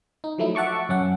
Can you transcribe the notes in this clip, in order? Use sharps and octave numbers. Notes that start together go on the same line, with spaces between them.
D#4
F3 F#3 A3 D#4 E4
E5 F#5 A5 C#6 D6
F#2 C#4 F#5